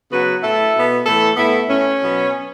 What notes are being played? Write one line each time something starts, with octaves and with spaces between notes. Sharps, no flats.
C#3 F#3 B3 F#4 B4
A2 A3 E4 A4
B2 B3
A2 E3 A3 E4 A4
A2 A3 B3 E4
A2 A3 C#4
B2 F#3 B3